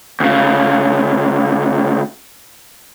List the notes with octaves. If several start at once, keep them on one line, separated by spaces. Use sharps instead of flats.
D2 C#3